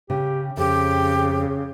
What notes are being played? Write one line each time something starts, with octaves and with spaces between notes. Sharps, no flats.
C#3 G4
F2 C#3 G4